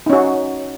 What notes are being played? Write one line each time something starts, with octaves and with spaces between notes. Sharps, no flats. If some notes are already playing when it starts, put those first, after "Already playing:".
C#4 D#4 F#4